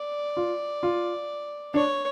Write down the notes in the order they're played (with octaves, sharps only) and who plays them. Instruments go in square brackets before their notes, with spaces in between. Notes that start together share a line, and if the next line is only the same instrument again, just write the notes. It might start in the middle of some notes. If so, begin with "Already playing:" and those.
Already playing: [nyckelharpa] D5
[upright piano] F4
F4
[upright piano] D4 [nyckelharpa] C#5